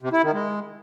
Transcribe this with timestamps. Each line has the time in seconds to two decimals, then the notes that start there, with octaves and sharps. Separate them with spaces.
0.02 C3
0.13 E4
0.23 D#3
0.34 G#3